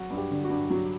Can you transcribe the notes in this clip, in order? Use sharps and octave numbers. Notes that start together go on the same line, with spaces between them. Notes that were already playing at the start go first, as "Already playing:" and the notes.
Already playing: F#3 F#4
G2
G4
D3
F#4
G2
F#3